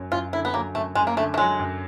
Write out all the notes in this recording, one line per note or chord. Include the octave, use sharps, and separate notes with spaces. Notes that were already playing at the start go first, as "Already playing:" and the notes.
Already playing: F#2 F#3
F#2 F4
D3 E4
B3
F#3 A#3
F#2 A3
F#2 G#3
A#3
D3 A3
A3
F#3 G#3
F#2